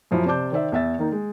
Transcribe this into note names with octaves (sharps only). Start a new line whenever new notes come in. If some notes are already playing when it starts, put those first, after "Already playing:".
F#2 F3 F#3 E4
C3 C5 D5 A5 D6 G6
D#3 C5 D5 E5
E2 E5 A6
D#3 A#3 D#4
G#3